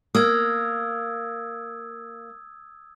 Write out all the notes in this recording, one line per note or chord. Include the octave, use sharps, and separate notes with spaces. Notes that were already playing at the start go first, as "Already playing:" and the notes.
A#3 D#6 E6 G#6